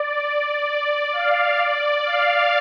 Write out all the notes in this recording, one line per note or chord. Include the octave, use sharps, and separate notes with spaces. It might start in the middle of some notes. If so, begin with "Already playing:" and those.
Already playing: D5
D5
D5
F5
D5
F5